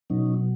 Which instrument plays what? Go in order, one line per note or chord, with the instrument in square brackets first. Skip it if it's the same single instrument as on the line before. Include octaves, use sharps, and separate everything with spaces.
[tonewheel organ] B2 F#3 C#4 D#4